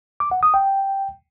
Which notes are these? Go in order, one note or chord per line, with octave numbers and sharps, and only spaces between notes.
D6
F#5
D#6
G5